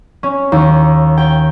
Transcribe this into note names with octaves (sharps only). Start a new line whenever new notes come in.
C#4
D#2
G5